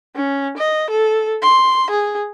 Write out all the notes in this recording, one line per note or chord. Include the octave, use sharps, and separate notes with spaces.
C#4
D#5
A4
C6
G#4